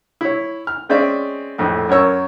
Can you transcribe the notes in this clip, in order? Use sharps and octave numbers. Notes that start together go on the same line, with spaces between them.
E4 C#5
F6
G#3 C4 C#4 D5 E5
A#1 F2 A2
F#2 A#4 C#5 E6